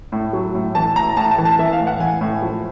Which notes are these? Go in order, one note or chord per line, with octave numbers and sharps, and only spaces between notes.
A2
F#3
A2
E3 A5
A2 A#5
A2 A5
A5
E3
A5
E3 E5
F5
A2
F#5
E3 G#5
A2
F3